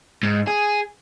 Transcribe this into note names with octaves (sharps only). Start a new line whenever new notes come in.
G#2
G#4